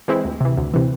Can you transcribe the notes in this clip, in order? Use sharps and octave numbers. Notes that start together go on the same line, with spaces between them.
E3 G#3 C4 E4
D2
C3 E3
D2
C3 E3